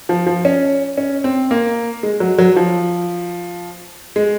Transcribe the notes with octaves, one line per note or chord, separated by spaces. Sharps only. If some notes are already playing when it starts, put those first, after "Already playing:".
F3
F3
C#4
C#4
C4
A#3
G#3
F#3
F#3
F3
G#3